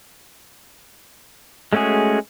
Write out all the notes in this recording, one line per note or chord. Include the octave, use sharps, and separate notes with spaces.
G#3 A3 C#4 F#4 G#4